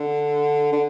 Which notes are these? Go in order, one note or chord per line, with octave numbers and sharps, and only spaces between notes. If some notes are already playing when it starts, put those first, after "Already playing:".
Already playing: D3
D3